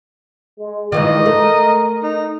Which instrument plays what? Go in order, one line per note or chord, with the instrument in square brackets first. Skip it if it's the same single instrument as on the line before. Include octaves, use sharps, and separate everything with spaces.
[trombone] G#3
[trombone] A#2 [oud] D#3 E3 G#3 [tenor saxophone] D#5
[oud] A3 [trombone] A#4
[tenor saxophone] D#4